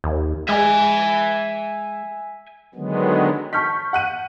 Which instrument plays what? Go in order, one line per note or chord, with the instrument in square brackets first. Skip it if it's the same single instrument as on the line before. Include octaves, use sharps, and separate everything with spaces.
[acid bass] D#2
[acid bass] G#3 [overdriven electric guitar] E5 G#5
[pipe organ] D3 D#3 F#3 G#3 B3
[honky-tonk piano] A5 C#6 F6 G6 B6
F#5 F#6 D#7